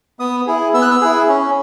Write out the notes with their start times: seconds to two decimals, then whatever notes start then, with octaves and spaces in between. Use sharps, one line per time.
0.19 B3 D#6
0.47 E4 G#4
0.74 B3 E6
0.82 F#6
0.91 E6
1.01 E4 G#4
1.29 C#4